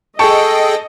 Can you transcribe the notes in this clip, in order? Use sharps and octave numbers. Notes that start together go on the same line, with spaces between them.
G#4 A4 D#5 G5 A5 C#6 C#7